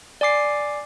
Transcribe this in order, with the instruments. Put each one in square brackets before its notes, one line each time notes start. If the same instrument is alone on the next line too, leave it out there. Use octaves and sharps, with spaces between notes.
[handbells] D5 G#5 D6 C7